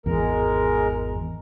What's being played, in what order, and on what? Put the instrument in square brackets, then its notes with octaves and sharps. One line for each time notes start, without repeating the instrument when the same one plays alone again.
[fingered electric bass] G#1 E2 [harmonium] G#3 A#4